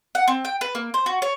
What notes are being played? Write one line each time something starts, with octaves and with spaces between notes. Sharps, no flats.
F#5
C4
G5
B4
A#3
C5
F#4
C#5